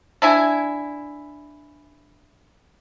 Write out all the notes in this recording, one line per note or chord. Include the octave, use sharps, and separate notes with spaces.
D4 E4 G#5